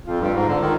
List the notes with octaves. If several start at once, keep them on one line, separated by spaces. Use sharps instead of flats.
F2 F4
G2
G#2
D3
D#3 F4